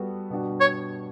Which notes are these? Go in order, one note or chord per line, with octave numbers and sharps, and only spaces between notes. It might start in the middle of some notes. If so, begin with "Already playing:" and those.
Already playing: G3 B3 F#4 A4
B2 G3 D4 F#4
C#5